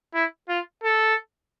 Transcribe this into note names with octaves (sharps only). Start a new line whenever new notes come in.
E4
F4
A4